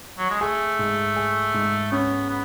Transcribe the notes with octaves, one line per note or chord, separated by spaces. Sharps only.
F#3
G#3
A3 G#4
G#2
G#4
G#2
B3 C#4
B3